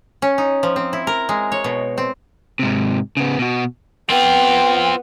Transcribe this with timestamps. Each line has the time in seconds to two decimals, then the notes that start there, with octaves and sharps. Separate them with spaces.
0.22 C#4
0.38 D#4
0.63 F3
0.76 C4
0.93 E4
1.07 A#4
1.29 G#3
1.52 C#5
1.64 B2
1.98 C4
2.59 G#2 C3
3.17 C#3 B3
3.39 B2 F#4
4.10 B3 C4 F4 G5